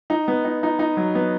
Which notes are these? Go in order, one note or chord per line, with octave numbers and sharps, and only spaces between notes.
D#4
B3
D#4
D#4
D#4
F#3
B3